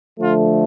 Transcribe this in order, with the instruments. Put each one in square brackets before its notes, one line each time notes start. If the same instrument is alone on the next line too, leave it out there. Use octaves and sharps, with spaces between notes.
[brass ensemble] D3 F3 A3 F4